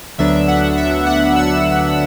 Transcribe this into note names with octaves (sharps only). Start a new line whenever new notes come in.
D2 D3 F#3 B3 D4 E5
F#5
E5
F#5
E6